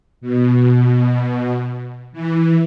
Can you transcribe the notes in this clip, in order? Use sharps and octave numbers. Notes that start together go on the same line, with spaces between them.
B2
E3